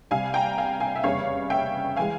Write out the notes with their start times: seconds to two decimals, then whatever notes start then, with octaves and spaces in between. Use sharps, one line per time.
0.11 C2 C3 G3 F5 G#5
0.34 G5 A#5
0.58 F5 G#5
0.80 F5 G#5
0.96 E5
1.04 F1 E2 C#3 G3 C#5 F5
1.50 E5 G5
1.96 E3 G#3 F5 G#5